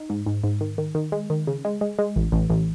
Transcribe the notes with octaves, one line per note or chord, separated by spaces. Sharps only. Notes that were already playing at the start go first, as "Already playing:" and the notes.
Already playing: D#4
G#2
G#2
G#2
D#3
D#3
D#3
G#3
D#3
C#3
G#3
G#3
G#3
A1
A1
A1